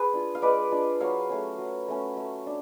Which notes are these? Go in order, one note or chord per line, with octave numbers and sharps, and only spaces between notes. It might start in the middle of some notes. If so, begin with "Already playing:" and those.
Already playing: G#4 B4
D4 F4
F5
G#3 B4 D5
D4 F4
F#3 C#5 F5
A3 C#4
F#3
A3 C#4
A3
D4